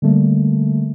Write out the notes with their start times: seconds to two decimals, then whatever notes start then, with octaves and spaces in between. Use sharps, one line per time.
0.02 D3 G3 A3 A#3